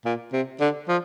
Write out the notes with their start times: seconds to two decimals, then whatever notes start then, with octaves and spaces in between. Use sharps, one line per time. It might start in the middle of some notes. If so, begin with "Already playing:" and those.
0.05 A#2
0.33 C3
0.60 D3
0.88 F3